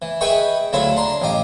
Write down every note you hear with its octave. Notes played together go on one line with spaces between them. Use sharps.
E3
G#4 B4 D#5 E5 G5 C#6
D2 F#3 E4 F4 A4 F5
D4 A#5 C6
A1 G4 D#5 F5